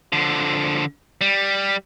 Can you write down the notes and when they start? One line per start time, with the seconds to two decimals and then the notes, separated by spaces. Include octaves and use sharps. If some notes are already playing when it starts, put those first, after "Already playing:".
0.13 D3 F3
1.21 G3